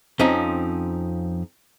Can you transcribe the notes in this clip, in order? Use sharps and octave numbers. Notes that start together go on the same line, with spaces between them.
F2 F3 C4 C#4 D#4